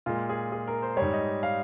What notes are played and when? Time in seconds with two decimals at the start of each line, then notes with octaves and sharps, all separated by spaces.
0.06 A#2 G#3 F4
0.29 G#4
0.52 G#4
0.68 A#4
0.82 C5
0.97 G#2 G3 C#5
1.13 D#5
1.43 F5